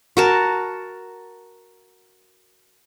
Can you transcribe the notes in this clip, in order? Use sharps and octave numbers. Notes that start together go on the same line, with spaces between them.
F#4 A#4 A5